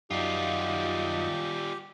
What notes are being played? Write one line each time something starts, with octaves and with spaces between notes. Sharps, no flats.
F#2 G3 D#4 F4 G4